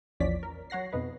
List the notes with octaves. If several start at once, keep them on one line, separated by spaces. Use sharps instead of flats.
A#1 E2 F3 C#4 D5 B6
A#4
F#3 C#5 F#5 A#6 C7
F2 B2 D#4 B4